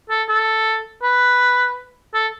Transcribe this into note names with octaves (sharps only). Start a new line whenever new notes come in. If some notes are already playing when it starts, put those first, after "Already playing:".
A4
A4
B4
A4